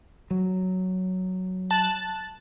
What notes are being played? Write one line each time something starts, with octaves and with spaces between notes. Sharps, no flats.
F#3
A5 F#6 A6